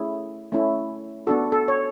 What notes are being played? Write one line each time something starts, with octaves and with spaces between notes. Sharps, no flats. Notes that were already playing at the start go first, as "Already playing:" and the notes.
Already playing: A3 C#4 E4 G#4
A3 C#4 E4
B3 D4 F#4 A4
A4
C#5